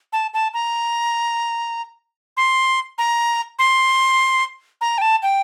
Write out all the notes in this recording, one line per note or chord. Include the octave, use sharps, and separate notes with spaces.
A5
A5
A#5
C6
A#5
C6
A#5
G5
A5
G5